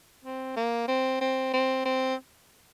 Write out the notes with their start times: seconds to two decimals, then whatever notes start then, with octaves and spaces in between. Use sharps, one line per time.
0.24 C4
0.56 A#3
0.88 C4
1.21 C4
1.53 C4
1.85 C4